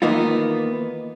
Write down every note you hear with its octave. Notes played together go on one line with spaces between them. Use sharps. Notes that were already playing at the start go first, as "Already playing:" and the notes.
D#3 E3 A#3 B3 D#4 F4